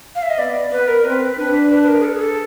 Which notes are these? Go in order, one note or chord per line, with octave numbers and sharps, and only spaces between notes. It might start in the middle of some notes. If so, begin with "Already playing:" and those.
F5
E5
D#5
B3 D5
B3 B4
A#4
C4 B4
D4 B4
B4
B4
A#4
G#4
A4
G#4
A4